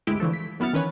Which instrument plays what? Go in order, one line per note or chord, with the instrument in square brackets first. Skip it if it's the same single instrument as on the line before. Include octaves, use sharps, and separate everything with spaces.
[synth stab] G1 D2 G#3 E4 G4 D7
D3 E3 F3 A3
B6
F#2 B3 E4 F6 A6 C#7
D#3 E3 C#4 B4 C#5